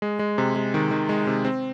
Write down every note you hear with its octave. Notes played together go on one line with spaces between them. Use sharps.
G#3
G#3
C3
G#3
D#3
D#3
G#3
C3
C4